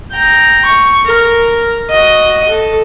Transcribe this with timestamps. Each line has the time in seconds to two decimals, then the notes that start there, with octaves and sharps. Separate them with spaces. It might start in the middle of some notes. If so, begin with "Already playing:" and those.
0.12 G5 A#5
0.65 C#6
1.06 A#4
1.90 F#4 D#5
2.49 A4